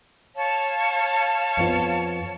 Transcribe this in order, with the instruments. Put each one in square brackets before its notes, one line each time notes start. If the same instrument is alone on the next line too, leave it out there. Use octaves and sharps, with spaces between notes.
[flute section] C#5 F5 A5
[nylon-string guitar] F2 B3 F4